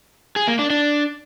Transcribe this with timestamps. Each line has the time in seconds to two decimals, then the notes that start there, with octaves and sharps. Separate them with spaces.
0.36 G#4
0.48 A#3
0.59 D4
0.70 D4